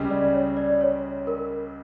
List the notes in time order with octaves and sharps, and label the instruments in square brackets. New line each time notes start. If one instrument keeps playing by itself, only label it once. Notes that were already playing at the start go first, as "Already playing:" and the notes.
Already playing: [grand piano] C#2 C#3 G3
[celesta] D5
C#5
D5
C#5
A#4